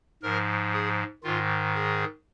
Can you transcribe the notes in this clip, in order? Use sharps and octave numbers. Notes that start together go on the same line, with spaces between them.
G#2 F3 A#4
G#4
G#2 D#3 F4
G#4